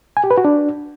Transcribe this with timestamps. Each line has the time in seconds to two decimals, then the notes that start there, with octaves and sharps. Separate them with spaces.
0.17 G#5
0.24 G4
0.31 B4
0.38 F#4
0.45 D4